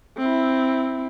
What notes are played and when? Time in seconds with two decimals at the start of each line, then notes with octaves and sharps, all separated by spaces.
0.18 C4 E4